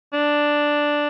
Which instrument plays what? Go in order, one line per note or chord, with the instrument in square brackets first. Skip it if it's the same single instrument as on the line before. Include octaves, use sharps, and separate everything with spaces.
[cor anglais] D4